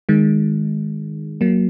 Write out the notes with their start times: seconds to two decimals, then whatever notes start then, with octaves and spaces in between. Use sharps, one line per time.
0.09 D#3 G#3
1.41 F#3 A#3